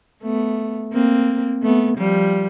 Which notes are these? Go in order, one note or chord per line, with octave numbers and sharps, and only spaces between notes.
A3 B3
A#3 C4
A3 B3
F3 G3